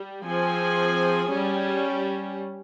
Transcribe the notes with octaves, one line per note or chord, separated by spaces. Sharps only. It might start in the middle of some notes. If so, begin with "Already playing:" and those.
Already playing: G3
F3 C4 G#4 G#5
G3 C#4